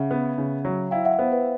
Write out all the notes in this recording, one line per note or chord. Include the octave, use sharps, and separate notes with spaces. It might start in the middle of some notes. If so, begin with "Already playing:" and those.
Already playing: C#3 E5 F#5
B3
C#3
F#3
E4 F5 G5
E5 F#5
B3 C5
B4